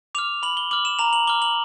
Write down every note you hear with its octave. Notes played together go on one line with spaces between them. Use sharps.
D6 F6 F7
B5 F#7
G7
D6 F6 F#7
E7
A#5 F7
F#7
D6 F6 G7
F#7